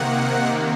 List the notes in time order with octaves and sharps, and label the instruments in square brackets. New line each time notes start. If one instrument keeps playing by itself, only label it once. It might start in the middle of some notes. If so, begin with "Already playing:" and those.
Already playing: [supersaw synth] C3 D#3 A#3 F#5